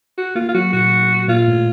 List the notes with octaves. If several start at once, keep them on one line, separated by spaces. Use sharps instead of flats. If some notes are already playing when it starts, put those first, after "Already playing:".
F#4
A#3 F4
F4
F#3 F#4
A#2 F#4
A#2 F4
A2